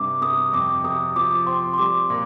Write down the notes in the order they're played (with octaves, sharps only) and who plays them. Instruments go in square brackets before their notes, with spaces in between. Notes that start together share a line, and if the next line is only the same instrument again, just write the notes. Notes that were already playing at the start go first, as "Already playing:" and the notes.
Already playing: [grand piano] G2 C3 [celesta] D6
[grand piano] C3 [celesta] D#6
[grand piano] F2 [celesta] D6
[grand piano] C3 [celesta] D#6
[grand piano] F3 [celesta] D6
[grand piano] C4 [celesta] C6
[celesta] C6
[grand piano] G3 [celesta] D6
[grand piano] A#2 [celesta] D6